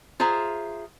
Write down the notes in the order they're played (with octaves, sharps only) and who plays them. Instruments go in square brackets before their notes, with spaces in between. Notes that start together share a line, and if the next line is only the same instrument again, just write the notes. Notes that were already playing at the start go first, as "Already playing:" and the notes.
[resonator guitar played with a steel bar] F4 G#4 C5 E5 A#5